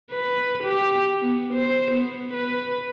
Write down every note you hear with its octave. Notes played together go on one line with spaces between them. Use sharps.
B4
G4
B3
C5
B3
B4